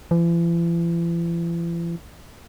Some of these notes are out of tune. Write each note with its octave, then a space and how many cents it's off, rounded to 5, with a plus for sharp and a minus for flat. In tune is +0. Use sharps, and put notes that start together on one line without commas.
E3 +45